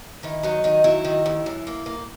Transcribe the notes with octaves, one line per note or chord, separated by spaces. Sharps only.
D#3 E4
F#3 D#4
D#3 D#4
F#3 E4
D#3
D#2
F#2
A#3
A#3